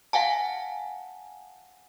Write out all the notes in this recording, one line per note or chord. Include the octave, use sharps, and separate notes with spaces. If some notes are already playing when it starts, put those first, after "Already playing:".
F5 F#5 G#5 A5